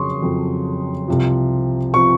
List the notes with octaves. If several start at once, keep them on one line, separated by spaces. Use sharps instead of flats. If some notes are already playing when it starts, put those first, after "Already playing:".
Already playing: F2 C#3 F#3 C6 C#6 D#6
F2 C#3 F#3
C2 C3 F3
C3 F3 C#6